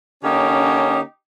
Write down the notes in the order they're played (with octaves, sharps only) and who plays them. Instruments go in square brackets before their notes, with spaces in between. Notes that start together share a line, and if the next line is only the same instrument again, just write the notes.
[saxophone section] D3 A#3 C#4 [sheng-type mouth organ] D#4 G4